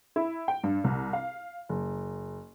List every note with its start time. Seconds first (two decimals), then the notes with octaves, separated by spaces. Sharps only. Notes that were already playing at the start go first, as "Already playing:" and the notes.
0.16 E4
0.48 G5
0.64 G2
0.84 C2
1.13 F5
1.69 F#1